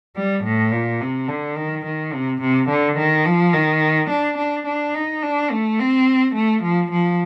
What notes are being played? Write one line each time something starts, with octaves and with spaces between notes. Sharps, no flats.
G3
A2
A#2
C3
D3
D#3
D#3
C3
C3
D3
D#3
F3
D#3
D4
D4
D4
D#4
D4
A3
C4
A3
F3
F3